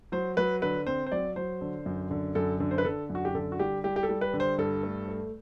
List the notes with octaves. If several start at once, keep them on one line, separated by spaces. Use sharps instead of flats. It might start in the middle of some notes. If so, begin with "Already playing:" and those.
F#3 C5
F#3 B4
D3 B4
C4 C5
C5
F#3 D5
F#3 C5
D3
F#2
D3
F#2 A4
D3
C5
B4
D3 A4
F#2
F#4
G4
D3 A4
F#4
G3 G4
G3 G4
G4
A4
G3
B4
D3
C5
G2 A4
A3
A3